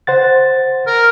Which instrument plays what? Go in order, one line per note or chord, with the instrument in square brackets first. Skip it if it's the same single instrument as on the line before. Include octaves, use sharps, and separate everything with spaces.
[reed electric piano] C5 F#5 A6
[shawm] A#4